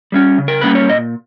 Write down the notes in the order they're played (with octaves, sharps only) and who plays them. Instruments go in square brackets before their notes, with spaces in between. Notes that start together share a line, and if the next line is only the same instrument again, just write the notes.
[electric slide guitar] G3 A#3 C#4
C#3
A#4
G3 A#3 C#4 B4
C#5
A#2 D#5